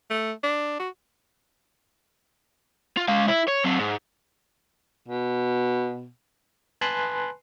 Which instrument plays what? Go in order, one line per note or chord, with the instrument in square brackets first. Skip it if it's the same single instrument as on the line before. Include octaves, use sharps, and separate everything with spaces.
[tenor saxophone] A3
D4
F#4
[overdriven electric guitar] F4
G#3 F5
E4
C#5
F#3 C4
G#2
[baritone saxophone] B2
[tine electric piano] B4 G#5 A5 B5 C6 F#6